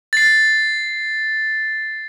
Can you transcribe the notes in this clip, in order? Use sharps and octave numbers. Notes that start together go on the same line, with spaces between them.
A6 C7